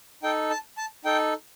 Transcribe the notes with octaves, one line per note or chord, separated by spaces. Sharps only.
D#4 A4 G5
A5
A5
D#4 A4 G5